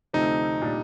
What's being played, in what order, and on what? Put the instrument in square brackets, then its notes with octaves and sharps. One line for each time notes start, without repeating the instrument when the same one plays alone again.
[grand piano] D2 C3 F3 A3 C4 [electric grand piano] D#4
[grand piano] A#2 G3 D4